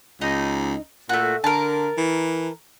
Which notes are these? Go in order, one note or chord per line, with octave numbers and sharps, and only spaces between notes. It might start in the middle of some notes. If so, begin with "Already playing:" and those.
C#2 D#4
A#2 A3 F#4
D3 A#4 A5
E3